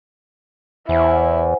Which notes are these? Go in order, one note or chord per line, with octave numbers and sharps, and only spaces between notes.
E2 E4 C5 F#5 G#5